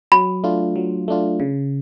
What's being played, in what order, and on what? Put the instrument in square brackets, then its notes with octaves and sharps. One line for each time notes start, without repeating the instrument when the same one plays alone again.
[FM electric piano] F#3 [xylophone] B5
[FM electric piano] A3 D4 F4
F#3
A3 D4 F4
C#3